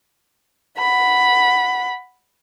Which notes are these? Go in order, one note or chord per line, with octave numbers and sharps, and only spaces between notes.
F#5 B5